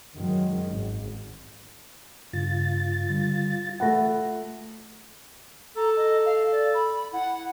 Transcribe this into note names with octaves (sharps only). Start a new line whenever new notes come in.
F#2 D#3 F#3 G#3
G#1
G2 C#3 F4 A6
D3 G3
A3 F4 F#5 B5 A#6
A4 A#5
D#5
F5
D5
B5
E4 F#5